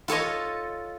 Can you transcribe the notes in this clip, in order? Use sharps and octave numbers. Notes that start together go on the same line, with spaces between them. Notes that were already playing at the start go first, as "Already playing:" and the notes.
F4 A4 C#5 D#5